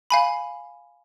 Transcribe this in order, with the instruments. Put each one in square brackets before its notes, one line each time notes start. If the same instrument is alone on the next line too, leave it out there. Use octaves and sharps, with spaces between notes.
[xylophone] F5 G#5 B5